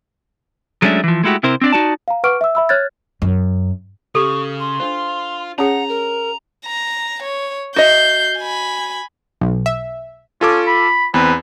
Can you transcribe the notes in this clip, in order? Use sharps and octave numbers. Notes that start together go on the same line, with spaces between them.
F#3 G#3 A3 C#4 D4 E5
E3 F3
G#3 A3 E4 F#4 G4
C3 C4 E4 A#4 C5
C4 D4 D5
D#4 F#4 D5 A5
F5 A#5
B4 F#5 C#6 D6 F6 D7
E5 E6
E5 B5 E6
C#5 F6 F#6 G#6 A6
F#2
C#3 G4 A4 C#6
C6
D4 F4 C5
C#4 G#4 C#5 F#5 A#5
A#4
A#5
C#5
F#4 D#5 E5 G6 C7
G#5 B5
B1
E5
C#4 F4 A4 D6
B5
E2 C4 B4